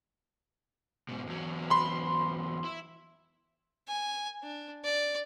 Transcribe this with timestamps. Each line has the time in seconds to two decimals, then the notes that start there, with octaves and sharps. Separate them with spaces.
1.09 G#2 B2
1.27 E2 F#3
1.70 B5 C6
2.64 E4
3.88 G#5
4.43 D4
4.84 D5